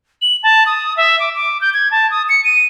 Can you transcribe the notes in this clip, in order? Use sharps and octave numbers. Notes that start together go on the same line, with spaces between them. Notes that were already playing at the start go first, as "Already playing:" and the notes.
F#7
A5
D#6
E5
D6
D6
G6
G#6
A5
D#6
C#7
D#7